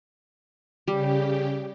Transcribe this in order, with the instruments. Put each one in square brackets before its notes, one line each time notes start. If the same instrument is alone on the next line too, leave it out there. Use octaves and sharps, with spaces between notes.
[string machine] C#3 G4 [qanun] G3